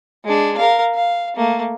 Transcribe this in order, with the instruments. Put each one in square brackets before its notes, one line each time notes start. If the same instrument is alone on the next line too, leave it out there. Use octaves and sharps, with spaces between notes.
[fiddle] G#3 D4
A#4 F5
F5
A3 A#3